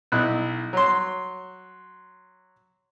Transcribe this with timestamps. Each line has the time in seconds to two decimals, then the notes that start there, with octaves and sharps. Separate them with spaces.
0.12 B1 E4 F#6
0.73 F#3 C6